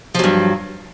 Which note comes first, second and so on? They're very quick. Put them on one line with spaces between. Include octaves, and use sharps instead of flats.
F3 F#3 G2